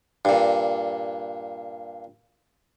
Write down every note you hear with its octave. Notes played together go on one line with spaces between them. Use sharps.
G2 A#2